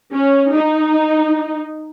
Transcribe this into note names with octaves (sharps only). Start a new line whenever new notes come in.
C#4
D#4